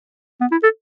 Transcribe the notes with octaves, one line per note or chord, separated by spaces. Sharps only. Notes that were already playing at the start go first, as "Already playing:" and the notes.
B3
E4
A4